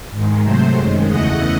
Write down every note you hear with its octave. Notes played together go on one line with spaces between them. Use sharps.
G#2 D#3 G#3
C3 F#3 A3 C5
F#2 D#3 G#3
E2 C#3 E3 A3 D#5 F#5